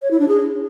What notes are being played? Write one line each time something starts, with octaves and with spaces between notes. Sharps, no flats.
C#5
E4
D4
G#4